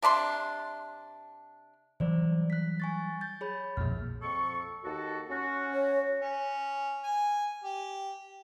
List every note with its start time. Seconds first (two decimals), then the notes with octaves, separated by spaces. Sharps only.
0.02 C3 D4 B5 C6
2.00 E3 F#3 G3 C5 D5
2.50 F#6 B6
2.80 G#5 C#6 A6
3.21 G6 A6
3.41 G#4 C#5 B5
3.77 A#1 F2 B2 A#3 F6
4.22 F2 A4 C#6
4.84 D#2 F#4 A4
5.29 C#4 F#4
5.74 C#5
6.21 C#4
7.04 G#5
7.64 G4